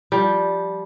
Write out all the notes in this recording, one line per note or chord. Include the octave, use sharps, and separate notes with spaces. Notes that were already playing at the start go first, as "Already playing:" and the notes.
F3 G3